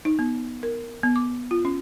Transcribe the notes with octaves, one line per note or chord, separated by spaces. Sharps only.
D#4
B3
A#4
B3
D6
F4
C#4